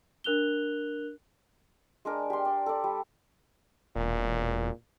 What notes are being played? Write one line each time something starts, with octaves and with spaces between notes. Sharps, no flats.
D4 A#4 F#6 F7 G7
G#3 D4 A#4
G4 C6
D5
A4 D5
G3
E1 A#2